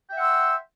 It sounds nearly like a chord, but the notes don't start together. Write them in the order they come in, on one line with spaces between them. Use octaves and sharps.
G5 E5 F#5 C6 E6